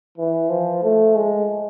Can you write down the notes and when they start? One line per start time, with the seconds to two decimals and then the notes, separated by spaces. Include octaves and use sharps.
0.18 E3
0.50 F3
0.83 A3
1.16 G#3